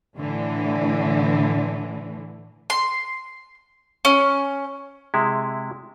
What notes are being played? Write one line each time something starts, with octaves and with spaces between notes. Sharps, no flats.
A2 D3 E3
C6
C#4
C3 G#3 E4